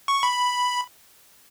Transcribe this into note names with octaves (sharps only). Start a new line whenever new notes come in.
C#6
B5